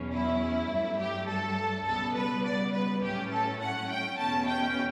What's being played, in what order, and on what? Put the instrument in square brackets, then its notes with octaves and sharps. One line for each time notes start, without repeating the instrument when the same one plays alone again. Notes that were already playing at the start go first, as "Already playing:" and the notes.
Already playing: [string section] E2 B2 F#3 C#4
E4
G2 F#3 A3
G4
A4
C#2 B2 G3 B3 A4
B4
D5
B4
A2 F#3 A3 C#4 G4
A4
F#5
G5
E2 B2 A3 C#4 A5
G5